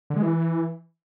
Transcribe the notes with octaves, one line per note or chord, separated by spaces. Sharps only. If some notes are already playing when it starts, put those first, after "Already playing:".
D3
G#3
E3